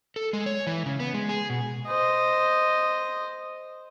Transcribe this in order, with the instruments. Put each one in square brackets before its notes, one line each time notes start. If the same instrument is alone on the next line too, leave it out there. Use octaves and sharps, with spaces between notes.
[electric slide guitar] A4
G#3
C#5
E3
C#3
B3
G#3
G#4
B2
[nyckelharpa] C5 D#5